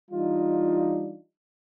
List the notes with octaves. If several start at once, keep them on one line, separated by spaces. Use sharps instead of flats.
E3 G3 D4 D#4 F4